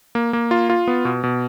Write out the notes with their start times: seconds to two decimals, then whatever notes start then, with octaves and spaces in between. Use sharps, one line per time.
0.15 A#3
0.33 A#3
0.51 F4
0.70 F4
0.88 B3
1.05 B2
1.24 B2